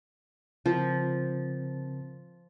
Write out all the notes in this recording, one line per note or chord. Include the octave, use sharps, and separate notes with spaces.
C#3 F3 C4 A#4